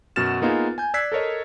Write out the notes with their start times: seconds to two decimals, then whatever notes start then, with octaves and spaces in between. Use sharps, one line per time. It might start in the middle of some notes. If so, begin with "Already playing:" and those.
0.16 F#2 B2 F#4 F6 A6 E7
0.42 A#3 B3 D#4 F4 G#4
0.78 G#5 G6
0.94 D5 E6 F#6 G#6 B6 C7
1.12 A4 A#4 C#5 D#5